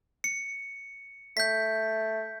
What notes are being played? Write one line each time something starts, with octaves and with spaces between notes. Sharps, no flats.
C#7
A3 G6 B6